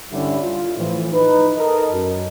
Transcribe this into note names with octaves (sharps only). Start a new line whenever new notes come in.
G2 D3 G3 C#4 E4
F4
A2 E3 F3
D#4 B4
A4 A#4 D#5
F#2